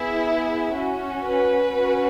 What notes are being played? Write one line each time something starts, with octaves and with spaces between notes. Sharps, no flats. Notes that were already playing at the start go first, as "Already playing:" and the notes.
Already playing: B3 E4 G#4 E5
C#4 F#4
B4
C#4 F#4